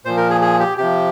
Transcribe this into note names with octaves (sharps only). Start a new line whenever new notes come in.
A#2 F3 C5
A#4
G#4
G#4
G4
C3 F3 G4